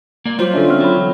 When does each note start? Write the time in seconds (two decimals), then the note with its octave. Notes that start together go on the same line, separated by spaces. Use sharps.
0.25 A#3 D5
0.39 F#3 G3 F4 C5
0.54 D3 C#4 D4 A4 C#5 E5
0.68 B3 C4 F6
0.80 F#3 A4 C#5 B5
0.98 E3